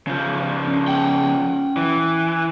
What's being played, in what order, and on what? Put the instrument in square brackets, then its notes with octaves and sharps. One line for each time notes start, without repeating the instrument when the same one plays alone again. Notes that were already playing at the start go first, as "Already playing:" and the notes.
[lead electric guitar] C#3 F3
[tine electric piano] C#4
[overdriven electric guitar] F#5 G5
[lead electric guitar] E3